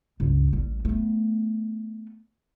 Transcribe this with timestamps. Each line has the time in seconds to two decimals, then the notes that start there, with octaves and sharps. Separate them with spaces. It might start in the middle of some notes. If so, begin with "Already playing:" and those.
0.20 C#2 G2
0.53 A1 G3
0.85 A3 B3